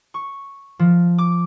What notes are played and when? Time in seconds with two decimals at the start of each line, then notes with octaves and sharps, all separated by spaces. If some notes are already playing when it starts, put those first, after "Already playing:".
0.14 C#6
0.79 F3
1.18 D6